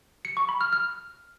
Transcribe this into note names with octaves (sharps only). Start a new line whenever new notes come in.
C#7
C#6
B5
F6
F6